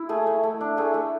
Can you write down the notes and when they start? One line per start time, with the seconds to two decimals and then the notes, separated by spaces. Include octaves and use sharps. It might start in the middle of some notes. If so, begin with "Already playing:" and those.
Already playing: E4
0.09 A3 G#4
0.27 A3
0.43 A3
0.61 D4
0.77 A3 G#4
0.94 A3